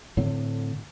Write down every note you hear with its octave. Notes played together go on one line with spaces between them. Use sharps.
A2 D3 C4